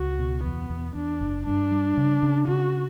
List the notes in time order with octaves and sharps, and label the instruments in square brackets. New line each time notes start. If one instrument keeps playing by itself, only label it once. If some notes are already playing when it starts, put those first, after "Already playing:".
Already playing: [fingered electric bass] C#2 [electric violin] F#4
[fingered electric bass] B2
[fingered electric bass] E2 [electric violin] B3
[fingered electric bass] E2
[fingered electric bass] E2 [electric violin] D4
[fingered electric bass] F#1
[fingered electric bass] G2 [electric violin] D4
[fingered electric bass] G3
C#3
C#3
[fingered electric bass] C#3 [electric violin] F#4